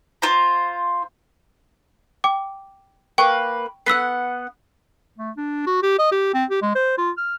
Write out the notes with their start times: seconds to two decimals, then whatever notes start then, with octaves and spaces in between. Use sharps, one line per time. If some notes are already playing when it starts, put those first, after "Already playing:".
0.22 F4 C5 A#5
2.24 G5 D6
3.18 A#3 B4 G5 C#6
3.86 B3 F#5 E6 B6 C7
5.18 A3
5.37 D4
5.66 F#4
5.82 G4
5.99 D#5
6.12 G4
6.34 C4
6.50 G4
6.62 G#3
6.75 C5
6.98 F4
7.18 F6